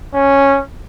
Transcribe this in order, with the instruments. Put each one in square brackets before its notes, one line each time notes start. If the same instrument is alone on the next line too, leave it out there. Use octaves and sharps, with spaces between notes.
[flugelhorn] C#4